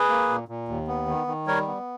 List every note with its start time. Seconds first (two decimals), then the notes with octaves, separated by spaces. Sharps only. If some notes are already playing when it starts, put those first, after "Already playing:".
Already playing: G#4 B4
0.09 A#3
0.29 A#2
0.48 A#2
0.68 D#2
0.88 B3
1.08 D#3
1.27 D#3
1.47 G3 A#4 C#5
1.67 B3